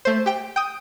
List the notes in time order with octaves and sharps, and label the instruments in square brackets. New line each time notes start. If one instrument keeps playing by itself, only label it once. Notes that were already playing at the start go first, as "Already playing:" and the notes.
[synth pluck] A3 C5
G4 G5
G5 D#6